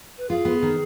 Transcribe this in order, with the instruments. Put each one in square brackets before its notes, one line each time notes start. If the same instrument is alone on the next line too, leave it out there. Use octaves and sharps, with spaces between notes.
[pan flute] B4
[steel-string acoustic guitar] F4 [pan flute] G#4
[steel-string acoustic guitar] B3
D#3